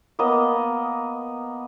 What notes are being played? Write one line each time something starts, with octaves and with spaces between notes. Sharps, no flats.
A#3 B3 D#5